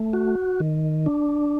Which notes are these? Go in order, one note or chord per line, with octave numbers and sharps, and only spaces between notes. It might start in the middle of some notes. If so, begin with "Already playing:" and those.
Already playing: A3
F#4
D#3
D4